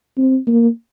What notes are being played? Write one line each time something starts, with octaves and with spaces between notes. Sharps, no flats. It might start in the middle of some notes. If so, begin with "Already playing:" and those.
C4
A#3